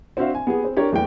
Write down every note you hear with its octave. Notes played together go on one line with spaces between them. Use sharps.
C4 D4 F#4 C5 E5 F5
G#5
B3 G4 G#4
C4
D4 G4 A#4 C#5
E2 A3 B4 G5